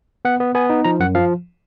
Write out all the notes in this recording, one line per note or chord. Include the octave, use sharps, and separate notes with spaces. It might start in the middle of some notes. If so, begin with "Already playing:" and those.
B3 F#5
B3
B3 G#5
D#4
F3 A#5
F#2 F#5
F3 F5